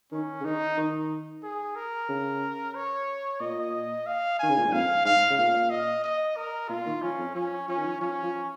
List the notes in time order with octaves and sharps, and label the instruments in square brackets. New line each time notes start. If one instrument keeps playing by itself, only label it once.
[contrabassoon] D#3 [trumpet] C#4
[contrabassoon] C#3
[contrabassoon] D#3 [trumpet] D#4
[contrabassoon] D#3
[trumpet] G#4
A#4
[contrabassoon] C#3
[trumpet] C#5
[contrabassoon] A#2 [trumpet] D#5
[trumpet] F5
[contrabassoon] D#3 [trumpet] G#5
[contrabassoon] C#3
A#2
G#2
[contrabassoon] F2 [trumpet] F5
[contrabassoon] G#2 [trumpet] F5
[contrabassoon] C#3
[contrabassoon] A#2 [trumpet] F5
[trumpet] D#5
D#5
A#4
[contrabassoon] A#2 [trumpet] F4
[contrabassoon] D#3
[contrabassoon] F3 [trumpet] C#4
[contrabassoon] F2
[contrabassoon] F3 [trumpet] C#4
[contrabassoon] F3 [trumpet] C#4
[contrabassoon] D#3
F3
[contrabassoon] F3 [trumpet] C#4
[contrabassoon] F3